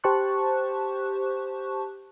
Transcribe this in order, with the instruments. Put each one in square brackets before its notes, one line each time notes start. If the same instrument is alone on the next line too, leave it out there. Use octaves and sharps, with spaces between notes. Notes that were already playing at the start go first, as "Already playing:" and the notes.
[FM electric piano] G4 C5 A5 C#6 F#6